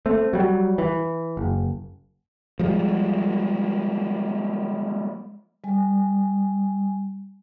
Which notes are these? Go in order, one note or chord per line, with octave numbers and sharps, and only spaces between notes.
A3 C4
F#3 G3
E3
F#1
F3 G3 G#3
G3 G#5